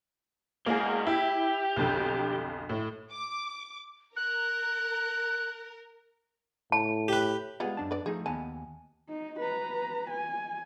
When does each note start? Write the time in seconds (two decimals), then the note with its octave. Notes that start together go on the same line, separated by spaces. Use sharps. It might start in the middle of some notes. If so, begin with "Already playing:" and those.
0.66 B2 G#3 A#3 G#4
1.07 E4 G4
1.76 B1 F2 D3
2.69 A2
3.12 D6
4.16 A#4 F#6
6.72 A2 A5
7.08 G4 B4
7.60 G3 G#3 B3 F4 G#4
7.77 F#2 D4 A5
7.91 B4 D5
8.06 F3 A3 D#4 G#4
8.26 D#2 B3 G#5 A5
9.09 D#4
9.40 B4 A#5
10.10 G#5